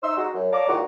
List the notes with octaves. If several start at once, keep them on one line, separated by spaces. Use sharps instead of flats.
D#4 C5 C6 E6
G#3 D#4 F#4
F#2
C#5 D5 F5 A5 A#5 D6
A#2 D#3 E3 G#3 F4 F#4